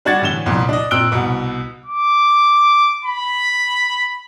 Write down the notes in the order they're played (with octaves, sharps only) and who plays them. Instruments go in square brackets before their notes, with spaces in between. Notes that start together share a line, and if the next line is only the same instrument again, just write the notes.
[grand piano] G3 D4 F#4 G#6 A6
A2 D3 E3 E7 G7
C2 F2 A#2
D4 D#5
A#2 C4 E6 F#6 D7 G7
C2 B2 B3
[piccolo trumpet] D6
B5